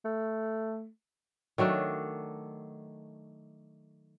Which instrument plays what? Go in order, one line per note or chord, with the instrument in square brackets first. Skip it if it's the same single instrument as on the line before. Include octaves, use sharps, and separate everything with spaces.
[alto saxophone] A3
[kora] D#3 F#3 A3 D4